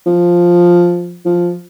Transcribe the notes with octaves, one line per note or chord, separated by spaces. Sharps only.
F3
F3